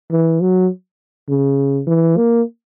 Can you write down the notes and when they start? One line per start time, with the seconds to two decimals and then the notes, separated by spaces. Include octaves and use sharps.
0.12 E3
0.41 F#3
1.29 C#3
1.87 E3
2.17 A#3